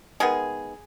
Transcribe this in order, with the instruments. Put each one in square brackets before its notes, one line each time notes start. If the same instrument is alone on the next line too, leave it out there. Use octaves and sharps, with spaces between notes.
[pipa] D#3 G#3 B3 G#4